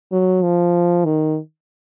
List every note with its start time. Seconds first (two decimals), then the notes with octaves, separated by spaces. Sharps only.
0.12 F#3
0.42 F3
1.05 D#3